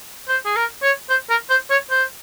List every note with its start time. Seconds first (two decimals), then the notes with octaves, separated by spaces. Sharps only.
0.28 C5
0.45 G#4
0.56 A#4
0.83 C#5
1.10 C5
1.30 A#4
1.50 C5
1.70 C#5
1.90 C5